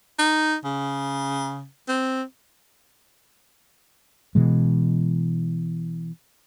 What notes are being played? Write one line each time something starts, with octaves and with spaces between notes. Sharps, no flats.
D#4
C#3
C4
B2 E3 G#3